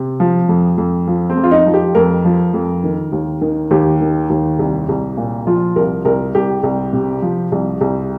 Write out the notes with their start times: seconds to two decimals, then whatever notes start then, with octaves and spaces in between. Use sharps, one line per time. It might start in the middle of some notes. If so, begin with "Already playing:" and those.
Already playing: C3
0.20 F3
0.49 F2
0.78 F2
1.07 F3
1.30 C4
1.37 F2
1.44 F4
1.51 D#4
1.66 F3
1.74 G4
1.95 F2 A#4
2.25 F3
2.54 F2
2.84 D#3
3.12 D#2
3.41 D#3
3.71 D#2 G4
4.00 D#3
4.30 D#2
4.59 C2
4.89 C2
5.17 A#2
5.47 F3 F4
5.76 C2 A#4
6.05 C2 A#4
6.35 C2 G4
6.63 C2
6.93 C3
7.22 F3
7.52 C2
7.81 C2